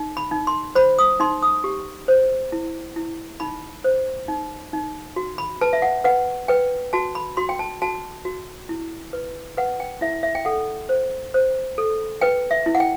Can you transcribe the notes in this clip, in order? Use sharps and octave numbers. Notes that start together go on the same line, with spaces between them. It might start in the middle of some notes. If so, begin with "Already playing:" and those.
Already playing: D#4
B5
D#4
C6
C5 B5
D#6
D#4 C6
D#6
G4
C5
E4
E4
D#4 B5
C5
D#4
D#4
F#4
B5
B4 A5
E5
F#5
B4 F#5
B4 G5
F#4 A5
B5
F#4 C6
G5
A5
F#4 A5
F#4
E4
B4
B4 F#5
G5
E4 E5
E5
G5
A4 F#5
C5
C5
A4
B4 G5
E5
E4
F#5
G5